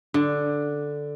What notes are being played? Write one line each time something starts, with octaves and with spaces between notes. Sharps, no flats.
D3